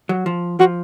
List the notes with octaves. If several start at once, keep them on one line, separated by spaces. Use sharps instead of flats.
F#3
F3
F3 F#4